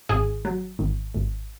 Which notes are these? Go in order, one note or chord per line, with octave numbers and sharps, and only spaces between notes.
G#1 G#4
F#3
G#1
G#1